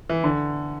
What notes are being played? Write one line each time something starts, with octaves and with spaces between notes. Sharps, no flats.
E3
D3